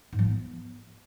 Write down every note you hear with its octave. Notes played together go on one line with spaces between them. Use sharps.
G#2
F3
B3